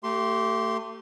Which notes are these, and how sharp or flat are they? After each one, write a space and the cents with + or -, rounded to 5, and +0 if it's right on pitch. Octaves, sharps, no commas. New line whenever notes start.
A3 +30 G4 -25 C6 +0